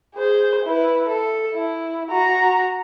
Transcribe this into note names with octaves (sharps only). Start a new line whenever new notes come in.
G#4 C5
E4 B4
A4
E4
F#4 A#5